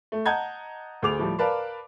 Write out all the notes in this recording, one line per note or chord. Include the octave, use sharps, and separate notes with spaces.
A3
D#5 F#5 A5 A#5 G6 G#6
D2 G#4 D6 F7
A2 F3 G3
A#4 B4 D5 F5 A5 B5